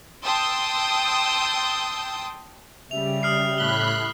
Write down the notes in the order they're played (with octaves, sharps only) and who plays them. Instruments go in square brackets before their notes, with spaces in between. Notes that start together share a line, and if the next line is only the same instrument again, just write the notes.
[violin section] G5 A5 C6 D#6 E6 G6
[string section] C#3 G3 [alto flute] E5 [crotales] F7
[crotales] D#6 F6 C7
[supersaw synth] A2 B5 F#6 [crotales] G7